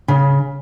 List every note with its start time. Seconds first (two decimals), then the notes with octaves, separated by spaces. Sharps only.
0.08 C#3